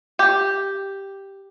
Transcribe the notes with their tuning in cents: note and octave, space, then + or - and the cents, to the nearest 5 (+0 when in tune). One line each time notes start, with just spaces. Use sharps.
G4 +0